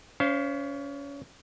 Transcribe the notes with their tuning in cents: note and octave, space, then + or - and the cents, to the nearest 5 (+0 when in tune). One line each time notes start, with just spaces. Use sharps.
C#4 +30 C5 +0 F5 -25